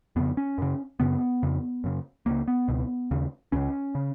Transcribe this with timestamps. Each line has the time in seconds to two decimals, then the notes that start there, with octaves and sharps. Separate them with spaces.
0.16 F2 C#3 B3
0.37 C#4
0.58 F#2 C#3
1.00 F#2 C#3 B3
1.43 F2 C#3
1.84 F#2 C#3
2.26 C#2 C#3 A#3
2.48 B3
2.68 C#2 B2
3.11 D#2 C#3
3.52 C#2 C#3 C#4
3.95 C#3